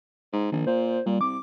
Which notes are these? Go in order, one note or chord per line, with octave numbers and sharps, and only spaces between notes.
G#2
A#1 D#3
A#2 C5
A#2 G3
C2 D6